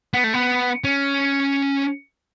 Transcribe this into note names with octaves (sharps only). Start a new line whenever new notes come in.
B3
A3
B3
C#4